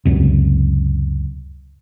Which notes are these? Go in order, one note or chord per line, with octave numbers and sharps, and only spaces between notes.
C#2 F#2 C3